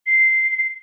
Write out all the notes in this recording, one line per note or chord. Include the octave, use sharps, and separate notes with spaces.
C7